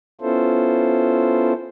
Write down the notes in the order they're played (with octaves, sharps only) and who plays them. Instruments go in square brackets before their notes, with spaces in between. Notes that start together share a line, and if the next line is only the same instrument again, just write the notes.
[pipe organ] B3 C#4 E4 F4 A4 C5